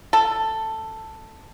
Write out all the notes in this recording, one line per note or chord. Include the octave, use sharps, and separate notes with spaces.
A4